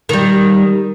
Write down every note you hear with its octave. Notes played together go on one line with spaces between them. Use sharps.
D#3 G3